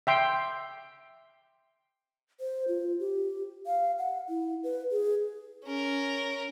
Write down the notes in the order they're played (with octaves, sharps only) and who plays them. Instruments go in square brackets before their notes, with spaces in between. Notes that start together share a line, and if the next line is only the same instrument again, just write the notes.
[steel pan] E5 G5 C6
[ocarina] C5
F4
G4
F5
F#5
E4
B4
G#4
[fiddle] C#4 A#4